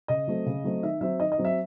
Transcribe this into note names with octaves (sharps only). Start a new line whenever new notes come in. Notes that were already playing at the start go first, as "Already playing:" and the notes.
C#3 D#5
F#3 A3 C4
C#3
F#3 A3 C4
D#3 E5
F#3 C4 E5
D#3 D#5
D#5
F#3 C4
E5